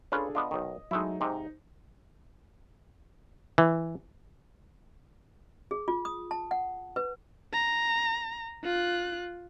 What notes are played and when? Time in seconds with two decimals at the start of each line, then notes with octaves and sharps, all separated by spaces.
0.12 C#4 D4 F4 G#4 A4 B4
0.35 B3 D4 F4 D#5
0.51 B1 D#3
0.91 F#3 G#3 A3 D#4 E4
1.21 G#2 C3 D#4
3.58 E3
5.71 G#4
5.88 F4
6.05 D#6
6.31 A5
6.51 F#5
6.96 B4
7.53 A#5
8.64 F4 F#6